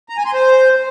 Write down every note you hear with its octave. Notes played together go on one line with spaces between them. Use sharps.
A#5
G#5
C6
C5